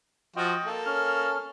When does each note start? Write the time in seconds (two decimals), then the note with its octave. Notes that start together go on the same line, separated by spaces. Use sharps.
0.36 F3 F4 F#4 D#5 G5
0.66 A#3 A4
0.86 C#4 F6